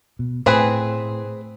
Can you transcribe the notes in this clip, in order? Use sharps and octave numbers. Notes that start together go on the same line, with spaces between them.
B2
A2 C4 G#4 B4